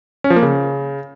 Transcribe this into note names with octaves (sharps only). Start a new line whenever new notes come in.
C#4
F3
A#3
C#3